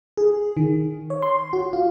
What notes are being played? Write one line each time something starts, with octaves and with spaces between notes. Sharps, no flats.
G#4
D#3
C#5
C6
F#4
F4